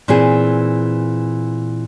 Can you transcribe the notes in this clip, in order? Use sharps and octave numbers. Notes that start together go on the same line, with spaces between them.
A#2 E3 C4 G#4